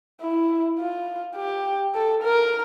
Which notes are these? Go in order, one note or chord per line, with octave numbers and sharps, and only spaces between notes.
E4
F4
G4
A4
A#4